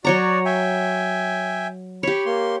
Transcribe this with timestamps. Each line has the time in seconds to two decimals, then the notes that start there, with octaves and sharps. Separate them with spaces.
0.05 F#3 F#4 C#5 D5 A#5
0.45 E5 G5 G#5
2.03 G4 C#5 B5
2.26 A#3 C6